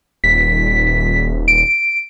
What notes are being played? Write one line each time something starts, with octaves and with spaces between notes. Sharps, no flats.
D#1 B6
D7